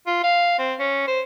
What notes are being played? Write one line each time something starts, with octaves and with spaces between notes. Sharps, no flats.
F4
F5
C4
C#4
C5